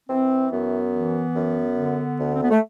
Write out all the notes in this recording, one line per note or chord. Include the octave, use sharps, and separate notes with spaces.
E3 C4
F#2 B3
E3
F#2
D3
D2
C4
B3
A3